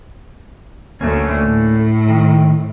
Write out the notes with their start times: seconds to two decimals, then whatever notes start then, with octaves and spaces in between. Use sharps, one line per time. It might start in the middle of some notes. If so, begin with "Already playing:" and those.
1.01 D2 D3 A3 A#3 C#4
1.45 A2
2.09 D#3